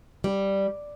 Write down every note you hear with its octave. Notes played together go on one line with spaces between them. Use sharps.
G3